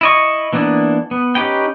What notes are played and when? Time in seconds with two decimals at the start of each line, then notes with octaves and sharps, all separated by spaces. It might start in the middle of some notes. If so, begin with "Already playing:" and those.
0.01 E4 D#5 C#6
0.53 E3 A#3 B3 D4 E4
1.11 B3
1.35 C#4 D#4 G4 B4 G5